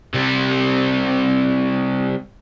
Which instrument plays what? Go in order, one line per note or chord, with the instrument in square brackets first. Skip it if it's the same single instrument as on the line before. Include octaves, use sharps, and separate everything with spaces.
[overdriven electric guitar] C3 G3